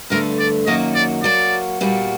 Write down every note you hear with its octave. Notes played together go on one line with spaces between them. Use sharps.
G2 D3 A3 A#4
D5
F#2 D#3 F#3 A#3 F#4 D#5
D5
F#3 A#3 F#4 D5
A#2 G3 A#3 F#4